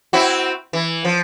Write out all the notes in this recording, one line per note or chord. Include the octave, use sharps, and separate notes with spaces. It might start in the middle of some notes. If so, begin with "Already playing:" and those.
C4 E4 F#4
E3
F3